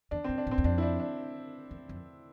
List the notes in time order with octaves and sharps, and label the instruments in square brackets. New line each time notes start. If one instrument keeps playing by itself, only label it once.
[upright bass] E2 [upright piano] D4
[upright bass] G2 [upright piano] C4
[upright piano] D4
[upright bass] A2
[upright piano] C4
[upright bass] E2
[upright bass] F2 [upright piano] D4
[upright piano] E4
D4
D4
[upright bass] E2
F2